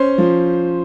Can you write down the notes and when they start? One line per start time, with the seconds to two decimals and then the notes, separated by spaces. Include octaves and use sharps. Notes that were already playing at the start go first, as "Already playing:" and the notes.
Already playing: C#4 C5 C6
0.18 F3